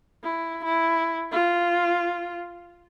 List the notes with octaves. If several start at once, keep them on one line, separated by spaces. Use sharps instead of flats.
E4
E4
F4